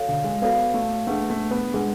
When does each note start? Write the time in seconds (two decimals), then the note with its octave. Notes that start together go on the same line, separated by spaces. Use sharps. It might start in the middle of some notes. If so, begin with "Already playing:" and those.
Already playing: F#4 A4 C#5 F5
0.09 D3
0.24 G#3
0.42 B3 F#4 A4 C#5 F5
0.74 A3
1.07 A3 D4 G#4 B4 F#5
1.30 A3
1.51 B3
1.73 G#3 D4 G#4 B4 F#5